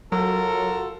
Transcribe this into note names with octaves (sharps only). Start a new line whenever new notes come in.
F#3 F4 F#4 A4 A#4